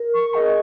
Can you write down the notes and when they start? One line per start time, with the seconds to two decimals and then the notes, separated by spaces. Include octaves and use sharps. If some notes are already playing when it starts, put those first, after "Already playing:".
Already playing: A#4
0.14 C#6
0.34 G#4 D#5